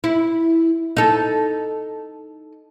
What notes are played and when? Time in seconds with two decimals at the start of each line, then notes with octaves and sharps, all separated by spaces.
0.04 E4
0.97 D#4 A4